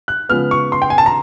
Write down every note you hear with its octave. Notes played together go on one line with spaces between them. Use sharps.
F#6
C#3 F3 G#3 B3 F6
C#6
C6
G5
G#5
A5
A#5